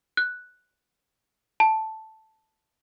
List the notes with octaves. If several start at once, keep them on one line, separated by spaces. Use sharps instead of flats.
F#6
A5